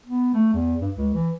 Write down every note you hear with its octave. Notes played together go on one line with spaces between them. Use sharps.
B3
A3
E2
G2
C#2
E3